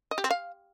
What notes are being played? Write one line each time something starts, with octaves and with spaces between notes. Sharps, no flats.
D#5
G4
C4
F5